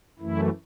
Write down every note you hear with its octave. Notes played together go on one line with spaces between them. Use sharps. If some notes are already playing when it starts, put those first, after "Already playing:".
F#2 E3 A3 E4